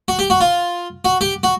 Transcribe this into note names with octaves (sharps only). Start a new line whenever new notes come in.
F#4
G4
F#4
F4
F#4
G4
F#4